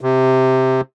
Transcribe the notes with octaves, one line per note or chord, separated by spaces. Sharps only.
C3